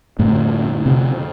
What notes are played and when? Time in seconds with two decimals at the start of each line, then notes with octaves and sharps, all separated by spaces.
0.19 F2 A2 D3 A3
0.86 C3 C4